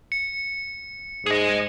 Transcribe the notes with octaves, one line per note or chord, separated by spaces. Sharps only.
C#7
G#2 G#4 D#5